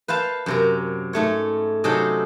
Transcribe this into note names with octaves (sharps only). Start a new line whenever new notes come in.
B4 C5 F5 A5
F#2 C3 A#5
G#2 A3 C#5
C3 F#3 C#4 D#4 A4 C5